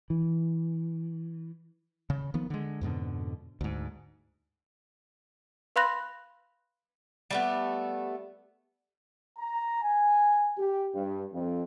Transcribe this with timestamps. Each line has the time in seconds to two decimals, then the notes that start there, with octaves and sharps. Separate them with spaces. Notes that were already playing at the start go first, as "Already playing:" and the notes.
0.10 E3
2.10 C#3
2.34 D#3 F3 B3
2.50 D3 G#3
2.81 F2 G#2 B2 D3
3.61 D2 G#2
5.76 B4 F5 B5 C6 F#6 A#6
7.30 G3 A3 B3
9.38 A#5
9.82 G#5
10.58 G4
10.94 G2
11.33 F2